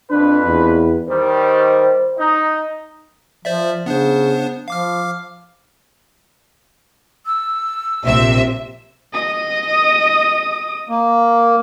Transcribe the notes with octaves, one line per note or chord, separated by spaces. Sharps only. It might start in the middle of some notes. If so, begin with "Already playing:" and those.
F2 D4 B4
E2
D#3 G3 C5
D#4
F3 C5 D5 E5
C#3 B3 D4 C5
F3 F5 D6 F6
E6
A#1 C3 E5
D#5 D#6
A#3